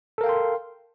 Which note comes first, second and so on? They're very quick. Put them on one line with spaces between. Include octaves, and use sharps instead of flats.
A4 A#4 F5 G5 C6